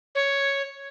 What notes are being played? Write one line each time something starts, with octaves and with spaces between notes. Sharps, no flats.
C#5